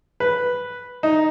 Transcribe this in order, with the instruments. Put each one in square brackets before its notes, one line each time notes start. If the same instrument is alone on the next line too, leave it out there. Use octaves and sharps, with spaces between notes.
[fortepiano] B4
D#4